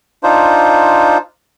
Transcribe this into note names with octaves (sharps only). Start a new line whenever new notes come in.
D4 D#4 F4 C5